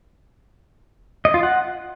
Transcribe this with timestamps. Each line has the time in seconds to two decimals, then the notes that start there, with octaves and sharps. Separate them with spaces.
1.25 D#5
1.34 F4
1.43 F#5